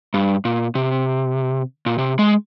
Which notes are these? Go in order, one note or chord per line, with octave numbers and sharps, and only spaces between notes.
G2
A#2
C3
A#2
C3
G#3